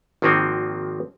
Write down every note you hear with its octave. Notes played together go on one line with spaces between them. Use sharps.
G#1 D#3 F3 A#3 C4 F#4